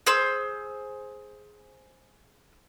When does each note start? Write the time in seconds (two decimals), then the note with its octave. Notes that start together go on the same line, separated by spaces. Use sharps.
0.07 G#4 C5 E6